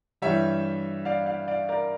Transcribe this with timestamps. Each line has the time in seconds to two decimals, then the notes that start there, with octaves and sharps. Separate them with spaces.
0.22 G2 E3 G3 C#5 E5
1.05 D5 F5
1.26 D5 F5
1.48 D5 F5
1.69 A#4 D5